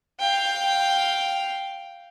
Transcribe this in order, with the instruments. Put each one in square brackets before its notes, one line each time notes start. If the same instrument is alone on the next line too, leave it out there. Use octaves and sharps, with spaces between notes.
[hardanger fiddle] F5 G5